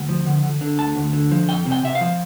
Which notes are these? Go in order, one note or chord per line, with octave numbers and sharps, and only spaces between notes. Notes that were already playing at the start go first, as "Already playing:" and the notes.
Already playing: D2
F3
D3
D3
D3
D2 A5
D2
D3
F3
F2 G5
C3
G5
C3 E5
F5
F3